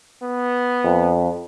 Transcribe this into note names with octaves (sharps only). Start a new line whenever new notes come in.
B3
F2